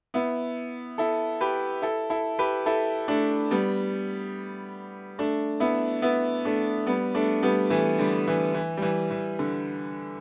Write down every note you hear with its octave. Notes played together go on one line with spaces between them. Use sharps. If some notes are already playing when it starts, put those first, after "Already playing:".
B3 E4
E4 A4
G4 B4
E4 A4
E4 A4
G4 B4
E4 A4
A3 D4
G3 B3
A3 D4
B3 E4
B3 E4
A3 D4
G3 B3
A3 D4
G3 B3
E3 A3
D3 G3
E3
E3
G3
E3
E3
D3